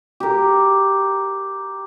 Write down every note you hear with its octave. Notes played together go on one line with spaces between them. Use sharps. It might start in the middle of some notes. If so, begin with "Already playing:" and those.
G4 A#4